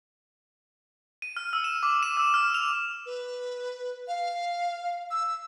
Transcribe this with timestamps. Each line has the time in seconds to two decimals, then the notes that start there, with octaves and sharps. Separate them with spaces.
1.22 D#7
1.37 F6
1.53 E6
1.64 E7
1.83 D6
2.03 E7
2.17 E6
2.34 F6
2.54 F7
3.06 B4
4.08 F5
5.11 E6